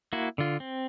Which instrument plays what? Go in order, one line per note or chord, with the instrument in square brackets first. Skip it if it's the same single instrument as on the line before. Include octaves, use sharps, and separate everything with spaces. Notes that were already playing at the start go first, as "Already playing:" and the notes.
[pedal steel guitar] A#3 E4 F#4
D3 F4
C4